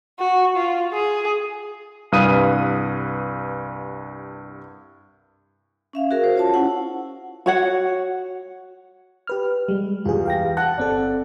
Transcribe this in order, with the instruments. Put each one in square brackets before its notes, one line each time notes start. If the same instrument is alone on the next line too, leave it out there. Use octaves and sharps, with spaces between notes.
[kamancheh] F#4
F4
G#4
[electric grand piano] C2 G2 B4 F5 D#6 D#7
[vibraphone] C#4 E5 F5
F#4 G#4 A#4
C5
F4 C#5 A5
C#4 E4 F#5
[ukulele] F#4 C#5 F#5
[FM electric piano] G4 B4 F6
G3 G#3
[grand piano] E2 G3 [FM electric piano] F4 G#4
[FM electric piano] F5 G5 A#6
[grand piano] F#5 F#6 [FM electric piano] A5
[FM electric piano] G1 C4 A4 [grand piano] D5